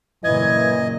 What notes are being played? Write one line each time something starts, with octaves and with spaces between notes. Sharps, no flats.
F#2 A#2 C#3 E3 D#5 G#6